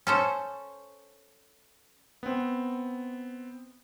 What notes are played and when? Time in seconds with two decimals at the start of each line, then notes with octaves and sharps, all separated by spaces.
0.07 C#4 A4 C5
2.23 B3 C4